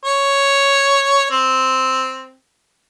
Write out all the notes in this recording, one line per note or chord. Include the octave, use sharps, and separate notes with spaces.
C#5
C4